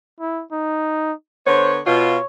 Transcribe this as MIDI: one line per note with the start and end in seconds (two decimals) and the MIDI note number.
0.20 0.43 64
0.52 1.12 63
1.47 1.80 50
1.47 1.80 59
1.47 1.75 72
1.47 1.80 73
1.86 2.17 47
1.86 2.17 65
1.86 2.26 73